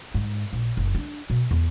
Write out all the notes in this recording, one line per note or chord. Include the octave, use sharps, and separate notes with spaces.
G#2
A#1
F#1
D4
B2
E2